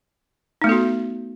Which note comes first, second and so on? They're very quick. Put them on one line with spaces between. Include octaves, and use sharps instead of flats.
D#4 A3 B3 A4 F#4